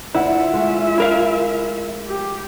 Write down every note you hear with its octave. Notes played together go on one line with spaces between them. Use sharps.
D2 E4 F4 E5 F#5
G#3 A3
E4 A#4 F5
G4